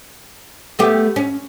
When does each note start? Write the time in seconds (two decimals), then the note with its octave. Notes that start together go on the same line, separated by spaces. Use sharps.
0.79 A3 B3 G4
1.16 C#4